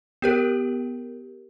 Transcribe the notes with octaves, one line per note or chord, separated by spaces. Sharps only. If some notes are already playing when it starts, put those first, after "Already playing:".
B3 G4 A#4